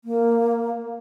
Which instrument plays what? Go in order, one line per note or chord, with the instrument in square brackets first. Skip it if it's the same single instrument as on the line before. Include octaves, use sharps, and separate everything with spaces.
[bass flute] A#3